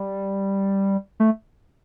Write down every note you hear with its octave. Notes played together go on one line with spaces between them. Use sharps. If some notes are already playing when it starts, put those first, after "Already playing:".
Already playing: G3
A3